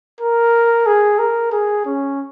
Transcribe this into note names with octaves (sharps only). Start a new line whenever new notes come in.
A#4
G#4
A#4
G#4
C#4